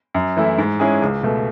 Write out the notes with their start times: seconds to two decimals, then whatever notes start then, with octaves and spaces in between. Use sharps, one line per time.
0.14 F#2
0.36 E3 A3 E4
0.58 G#2
0.80 G#3 C#4 E4 G#4
1.02 C#2
1.23 B2 A3